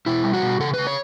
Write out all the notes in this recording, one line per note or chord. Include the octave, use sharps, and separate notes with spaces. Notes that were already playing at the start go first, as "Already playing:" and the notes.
B2 E4
G3
F#4
B2
C#3 A4
C#3 B4
C#5